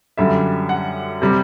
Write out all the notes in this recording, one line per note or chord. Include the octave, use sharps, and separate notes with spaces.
F#2 D3 G3 E5
F#5
C3 G3